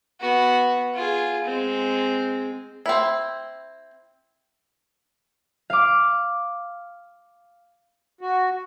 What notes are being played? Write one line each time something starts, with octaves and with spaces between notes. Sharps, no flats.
B3 F#4
F4 G#4
G#3 C4
C4 E4
F5 D6
F#4